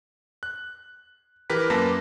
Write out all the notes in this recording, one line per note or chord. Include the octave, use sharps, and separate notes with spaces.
F#6
E3 G4 A#4 B4 B6
F#2 A#3 B4 A5 D6 A#6